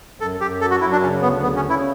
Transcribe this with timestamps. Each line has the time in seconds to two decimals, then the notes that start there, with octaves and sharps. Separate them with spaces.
0.20 F#2 A4
0.41 F#2 G4
0.61 F#3 A4
0.71 F#4
0.81 F#2 E4
0.92 D4
1.02 C#3 C#4
1.22 D2 B3
1.43 C#3 B3
1.56 C#4
1.63 C#3
1.70 E4